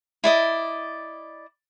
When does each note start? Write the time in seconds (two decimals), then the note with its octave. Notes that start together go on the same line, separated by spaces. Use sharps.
0.24 E4 D5 D#5